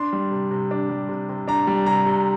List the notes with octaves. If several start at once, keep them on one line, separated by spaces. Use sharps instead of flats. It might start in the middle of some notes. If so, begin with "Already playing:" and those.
Already playing: D4 C6
G3
C3
C3
D4
G3
C3
C3
D4 A#5
G3
C3 A#5
C3